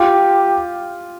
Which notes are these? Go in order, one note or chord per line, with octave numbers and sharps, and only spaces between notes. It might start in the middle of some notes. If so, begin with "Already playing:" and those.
Already playing: F4 G4